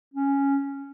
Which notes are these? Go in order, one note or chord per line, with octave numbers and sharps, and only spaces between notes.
C#4